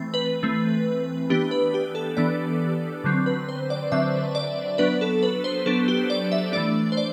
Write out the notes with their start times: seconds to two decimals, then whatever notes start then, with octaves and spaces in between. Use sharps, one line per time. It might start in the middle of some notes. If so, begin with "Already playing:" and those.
Already playing: E3 A3 C4
0.14 B4
0.43 E3 A3 C4
1.30 E3 B3 D4 G4
1.51 B4
1.74 G4
1.95 A4
2.17 E3 B3 D4 D5
3.04 D3 F#3 C4
3.26 B4
3.49 C5
3.70 D5
3.92 D3 F#3 C4 E5
4.35 D5
4.78 F#3 B3 D4 B4
5.01 A4
5.23 B4
5.44 C5
5.66 F#3 B3 D4 A4
5.88 G4
6.10 D5
6.32 E5
6.53 E3 A3 D4 D5
6.92 C5
6.97 D5